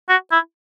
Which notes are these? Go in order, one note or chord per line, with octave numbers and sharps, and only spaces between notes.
F#4
E4